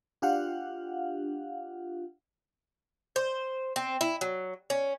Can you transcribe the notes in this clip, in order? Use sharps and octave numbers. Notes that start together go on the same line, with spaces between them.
D4 F4 G4 F5 F#5
C5
C4
E4
F#3
C#4